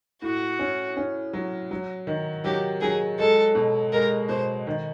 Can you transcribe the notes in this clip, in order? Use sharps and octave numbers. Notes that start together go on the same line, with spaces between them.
A2 F#4
C#4
C#4
F#3
F#3
D#3
F#3 G4
F#3 G#4
G#3 A4
B2
G#3 A#4
B2 C5
D#3